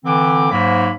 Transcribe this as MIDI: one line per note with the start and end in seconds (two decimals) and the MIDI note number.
0.05 0.49 50
0.05 0.49 52
0.05 0.49 60
0.05 0.49 86
0.51 0.90 44
0.51 0.90 54
0.51 0.90 58
0.51 0.90 83